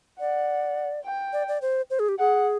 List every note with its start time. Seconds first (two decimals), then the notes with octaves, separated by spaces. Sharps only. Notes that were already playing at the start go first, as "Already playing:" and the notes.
0.20 D5 F#5
1.05 G5
1.33 D5
1.48 D5
1.62 C5
1.90 C5
1.99 G#4
2.09 G4
2.19 G#4 F#5